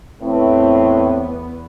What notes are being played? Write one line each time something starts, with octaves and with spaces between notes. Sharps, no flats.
E2 A2 B3 C4 B4